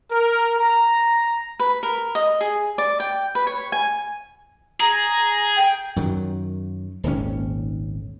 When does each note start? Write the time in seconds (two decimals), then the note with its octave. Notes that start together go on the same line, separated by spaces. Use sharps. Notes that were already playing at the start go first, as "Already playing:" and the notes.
0.11 A#4
0.57 A#5
1.60 B4
1.83 A#4
2.15 D#5
2.41 G#4
2.78 D5
3.00 G5
3.35 B4
3.47 C#5
3.72 G#5
4.80 G#4 A#5
5.56 G5
5.96 F#2 D#3 F#3
7.03 D#1 G#1 D#2 C#4